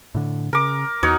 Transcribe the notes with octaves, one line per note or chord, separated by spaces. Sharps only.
A2 D3
C#3 A#4 D6
E2 D#4 F#4 C#5